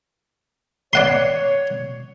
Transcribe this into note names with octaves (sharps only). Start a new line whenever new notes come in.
C#5 D5 F#5 C6